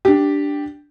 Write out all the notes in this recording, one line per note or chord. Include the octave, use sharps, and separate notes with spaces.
D4 G4